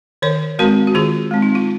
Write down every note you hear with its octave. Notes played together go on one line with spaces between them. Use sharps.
D#3 A#4 C#5
G#3 C4 F#4 A#4
F#4
D#3 F4 G#4
G#3 C4
D#4
F4